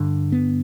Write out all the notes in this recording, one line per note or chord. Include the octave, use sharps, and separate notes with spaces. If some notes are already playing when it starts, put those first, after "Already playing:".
Already playing: G2 D3
B3